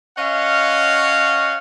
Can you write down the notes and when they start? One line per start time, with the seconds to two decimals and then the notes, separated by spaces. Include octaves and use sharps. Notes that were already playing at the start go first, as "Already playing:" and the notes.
0.17 C#4 C#5 D#5 F5 F#5